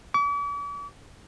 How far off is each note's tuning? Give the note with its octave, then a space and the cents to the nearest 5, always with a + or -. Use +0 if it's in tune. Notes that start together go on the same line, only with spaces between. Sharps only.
D6 -45